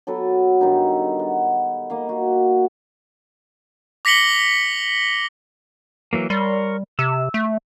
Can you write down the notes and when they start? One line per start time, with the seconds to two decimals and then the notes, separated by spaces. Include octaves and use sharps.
0.07 F#3 B3 A4 B4
0.61 G2 D#3 D#4
1.19 F#5
1.90 A#3 D#5 F5
2.09 F#4
4.05 D6 A#6 B6 C#7 F#7 G7
6.13 E3 F#3 A#3
6.30 G3 A#4 C#5 C6
6.99 C3 E6
7.34 A3